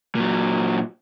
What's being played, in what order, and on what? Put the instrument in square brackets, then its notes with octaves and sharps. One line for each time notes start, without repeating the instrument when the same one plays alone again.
[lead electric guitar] A#2 F#3